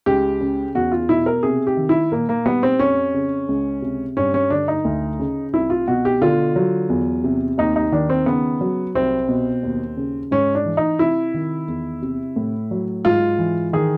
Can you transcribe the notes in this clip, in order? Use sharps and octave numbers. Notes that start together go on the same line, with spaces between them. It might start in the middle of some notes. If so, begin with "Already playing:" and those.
C#2 G4
C#3
E2 F#4
F4
B2 E4
A#4
C3 G#4
G4
D#3
E4
A#2 A#3
A#3
G3 B3
C4
F2 C#4
C#3
C#2
C3
G2 C#4
C#4
D3 D4
D#4
D2
C#3
C2 E4
F4
B2 F#4
G4
D3 F4
F#3
E2
C3
D#2 D#4
D#4
D#3 D4
C4
C#3 B3
F#3
C2 C4
B2
D#2
C#3
G#2 C#4
D4
E3
D#4
C3 E4
D#3
E2
C3
A2
F#3
G#2 F4
E3
D#3 G#4